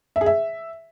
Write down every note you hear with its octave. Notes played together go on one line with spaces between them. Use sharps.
E5
G#4
E5